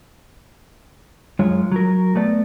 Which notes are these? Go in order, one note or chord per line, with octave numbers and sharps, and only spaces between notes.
F#2 G#3 F4 C#5
F#3 A#4
A3 B3 D5